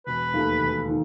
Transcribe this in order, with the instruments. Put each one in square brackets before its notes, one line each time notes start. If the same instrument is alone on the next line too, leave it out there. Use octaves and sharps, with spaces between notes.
[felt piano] E1 [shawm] B4
[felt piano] D#2 D#3 A3
E1
D#3